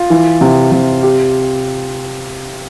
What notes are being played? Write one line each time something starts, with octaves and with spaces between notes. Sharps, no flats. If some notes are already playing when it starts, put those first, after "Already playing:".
Already playing: F4
E3
C3
C3
G4